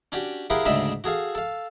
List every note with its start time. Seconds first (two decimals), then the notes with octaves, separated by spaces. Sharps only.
0.12 C#4 D4 F#4 G4
0.50 E4 G4 G#4 A#4 F5 F#5
0.65 D2 G#2 C#3 D4 D#5 E5
1.04 F#4 G#4 A4 F5
1.35 A4 F5